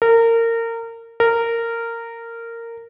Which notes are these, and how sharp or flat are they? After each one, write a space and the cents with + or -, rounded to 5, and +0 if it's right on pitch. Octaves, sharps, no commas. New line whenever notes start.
A#4 -25
A#4 -15